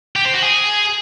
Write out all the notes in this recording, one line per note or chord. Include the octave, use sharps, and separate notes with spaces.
G4
C5
F#4
G#4